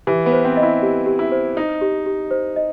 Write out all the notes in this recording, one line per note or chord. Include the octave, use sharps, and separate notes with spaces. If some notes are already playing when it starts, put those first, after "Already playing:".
E3 G4
B3
C5
C4
D#5
E4
G4
G4
E4
C5
D#4 D#5
G4
G4
C5
D#5